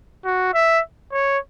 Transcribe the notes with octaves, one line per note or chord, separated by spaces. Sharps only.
F#4
E5
C#5